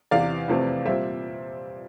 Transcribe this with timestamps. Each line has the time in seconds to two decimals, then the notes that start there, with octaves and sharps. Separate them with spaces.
0.11 E2 C3 E3 D5 F5
0.48 F2 C3 E3 A3 C4
0.85 A#2 G3 C4 C5 E5